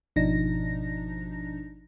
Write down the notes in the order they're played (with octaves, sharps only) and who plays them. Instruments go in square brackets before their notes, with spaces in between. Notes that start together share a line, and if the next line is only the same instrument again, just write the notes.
[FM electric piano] G#1 B2 F3 D4 D#4 A#6